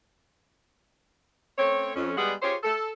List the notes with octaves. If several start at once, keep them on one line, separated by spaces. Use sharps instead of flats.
A3 C4 C#4 C#5
F2 C#4
G3 G#3 B3 G#4 D5 F#5
F4 G4 G#4 C5 C#5
A4